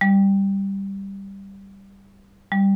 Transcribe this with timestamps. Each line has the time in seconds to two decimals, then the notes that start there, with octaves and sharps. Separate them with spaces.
0.01 G3
2.52 G3